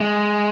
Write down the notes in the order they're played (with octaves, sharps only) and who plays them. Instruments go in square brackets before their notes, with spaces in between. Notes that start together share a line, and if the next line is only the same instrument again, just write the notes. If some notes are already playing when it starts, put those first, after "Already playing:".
[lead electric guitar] G#3